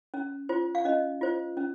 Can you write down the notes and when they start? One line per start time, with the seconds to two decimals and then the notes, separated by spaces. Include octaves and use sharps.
0.14 C#4
0.49 F4 C5
0.75 F5
0.85 C#4 D#5
1.21 F4 C5
1.57 C#4